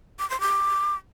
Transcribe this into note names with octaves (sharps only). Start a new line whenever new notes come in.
D6
C6
D6